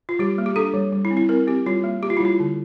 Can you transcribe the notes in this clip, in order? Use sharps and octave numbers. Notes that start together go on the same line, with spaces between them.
F4
G3 G4
A#3
G4
D4 A4
G3
G3
E4
C4
E4
C4 A#4
C4 G4
G3 F4
A#3
A#3 G4
F4
E4
G3 F4
D3